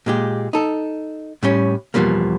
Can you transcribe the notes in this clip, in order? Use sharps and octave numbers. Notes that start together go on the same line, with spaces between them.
A#2 G#3 G4
D#4 A4
A2 G3 C#4
E2 G#2 B2 F3 G3 A#3